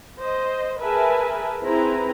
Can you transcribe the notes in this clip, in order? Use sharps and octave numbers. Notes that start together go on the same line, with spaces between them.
C5 D#5
G#4 A#4 B4 E5 G#5 A5
C4 E4 G#4 B4 A#5